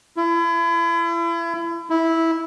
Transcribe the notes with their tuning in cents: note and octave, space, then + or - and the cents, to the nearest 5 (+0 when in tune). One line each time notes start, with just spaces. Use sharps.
E4 +35
E4 -10